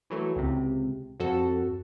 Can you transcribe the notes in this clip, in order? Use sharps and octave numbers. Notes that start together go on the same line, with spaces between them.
E3 F#3 A3
C#2 C3
F2 F#4 A4